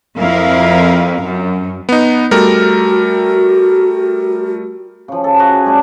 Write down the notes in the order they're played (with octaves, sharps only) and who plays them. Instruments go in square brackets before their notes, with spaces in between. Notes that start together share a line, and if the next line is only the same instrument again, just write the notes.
[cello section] F2 F3 E4 A#4 F5
F#2
[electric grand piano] B3 D#4
[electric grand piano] G3 A3 A#4 [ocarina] F#4
[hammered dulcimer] C#3 F3
A4
F#4 G#4 B4
G#5
G3 A3 C#4 D4